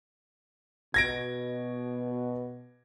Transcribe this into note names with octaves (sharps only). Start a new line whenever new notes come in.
B2 G#6 A#6 D7